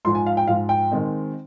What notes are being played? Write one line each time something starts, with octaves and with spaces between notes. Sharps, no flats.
G#2 F3 G#3 C6
G#5
F5
G5
G#2 F3 G#3 F5
G5
D#3 G#3 C4 D#4